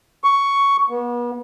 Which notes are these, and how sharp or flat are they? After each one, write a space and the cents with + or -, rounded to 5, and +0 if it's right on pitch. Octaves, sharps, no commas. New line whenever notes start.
C#6 +10
B3 -40